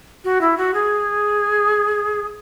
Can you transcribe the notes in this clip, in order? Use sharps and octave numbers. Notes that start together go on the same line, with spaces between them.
F#4
E4
F#4
G#4